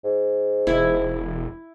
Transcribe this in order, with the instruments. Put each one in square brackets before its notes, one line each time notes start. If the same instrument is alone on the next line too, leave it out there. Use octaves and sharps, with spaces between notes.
[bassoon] G#2
[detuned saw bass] E1 [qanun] E4